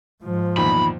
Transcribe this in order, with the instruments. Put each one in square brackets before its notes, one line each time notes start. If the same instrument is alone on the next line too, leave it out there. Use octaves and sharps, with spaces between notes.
[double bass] G#2 F3
[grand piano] E2 A#2 D#3 [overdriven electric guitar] B5